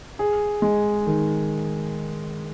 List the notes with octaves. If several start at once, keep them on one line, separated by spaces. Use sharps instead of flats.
G#4
G#3
D#3